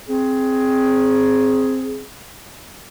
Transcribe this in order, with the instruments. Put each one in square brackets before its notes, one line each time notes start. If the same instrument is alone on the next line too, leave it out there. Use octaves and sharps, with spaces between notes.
[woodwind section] C4 G#4